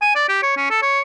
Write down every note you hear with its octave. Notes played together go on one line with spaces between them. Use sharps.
G#5
D5
G4
C#5
C#4
A4
C#5